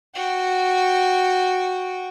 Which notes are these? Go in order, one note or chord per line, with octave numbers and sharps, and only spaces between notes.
F#4 G5